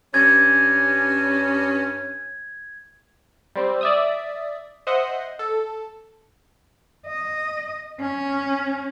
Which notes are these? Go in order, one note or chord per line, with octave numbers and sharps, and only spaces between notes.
G2 C#4 G#6
G3 C4
D5 E5 D#6
C5 D#5 E5 F#5
A4
D#5
C#4